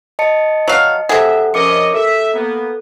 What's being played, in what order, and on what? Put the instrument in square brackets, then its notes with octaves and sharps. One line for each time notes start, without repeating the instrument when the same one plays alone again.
[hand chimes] D#5 A5 C#7
[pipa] F#3 F5
[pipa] C3 G#4 [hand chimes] A4 F#5 [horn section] E5
[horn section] F3 C#4 D#5 [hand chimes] A#4 D6 C#7
[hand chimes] A4 [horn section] E5
[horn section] A#3 B3